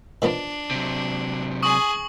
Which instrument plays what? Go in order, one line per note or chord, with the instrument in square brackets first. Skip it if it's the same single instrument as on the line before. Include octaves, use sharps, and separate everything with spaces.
[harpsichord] D#3 F3 B3 [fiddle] D4
[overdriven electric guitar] C3 F#3
[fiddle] G#4 G#5 [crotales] C#6 D#6 F#7